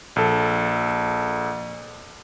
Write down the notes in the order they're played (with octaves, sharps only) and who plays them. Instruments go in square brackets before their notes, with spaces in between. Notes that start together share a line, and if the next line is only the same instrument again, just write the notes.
[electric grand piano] A#1 A4